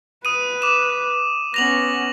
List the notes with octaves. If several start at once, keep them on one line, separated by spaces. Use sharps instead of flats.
B4 D#6 D#7
D6 E7
B3 C#4 A#6 F7 F#7